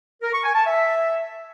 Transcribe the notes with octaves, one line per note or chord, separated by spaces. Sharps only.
A#4
C#6
G#5
A5
E5